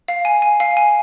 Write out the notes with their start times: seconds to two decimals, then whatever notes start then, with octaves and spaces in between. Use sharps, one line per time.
0.08 F5
0.25 G#5
0.42 G#5
0.60 F5
0.77 G#5